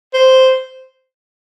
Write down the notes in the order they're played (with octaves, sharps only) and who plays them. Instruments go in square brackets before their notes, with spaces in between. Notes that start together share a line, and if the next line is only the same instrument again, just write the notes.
[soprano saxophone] C5